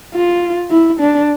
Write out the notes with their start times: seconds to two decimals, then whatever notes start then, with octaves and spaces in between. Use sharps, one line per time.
0.15 F4
0.71 E4
1.00 D4